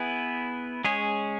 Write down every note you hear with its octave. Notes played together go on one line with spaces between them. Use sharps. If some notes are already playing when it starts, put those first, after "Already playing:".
Already playing: B3 E4 G#4 B4
G#3 C#4 G#4 C#5